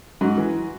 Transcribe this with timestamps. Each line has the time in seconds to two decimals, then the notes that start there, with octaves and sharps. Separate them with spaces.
0.21 G#2 F#4
0.37 E3